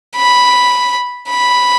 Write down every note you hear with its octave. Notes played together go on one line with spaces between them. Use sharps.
B5
B5